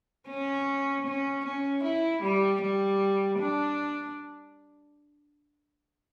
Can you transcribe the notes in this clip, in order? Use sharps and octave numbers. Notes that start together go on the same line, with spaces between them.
C#4
C#4
C#4
E4
G3
G3
D4